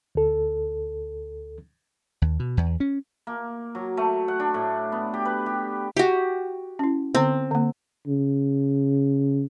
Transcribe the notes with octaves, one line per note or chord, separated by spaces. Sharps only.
D2 A4
D#2
B2
E2
C#4
A#3
F#3
A3
F#5
D4
A2
B3
G4
B4
G4
F#4 G4
C#4 E4
D3 B3 C4
D3 A#3
C#3